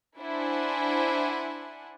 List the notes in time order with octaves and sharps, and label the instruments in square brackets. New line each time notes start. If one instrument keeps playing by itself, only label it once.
[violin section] D4 E4 C5 F#5 G#5